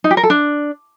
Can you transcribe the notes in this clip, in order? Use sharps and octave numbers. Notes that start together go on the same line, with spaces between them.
D#4
G4
A#4
A4
D4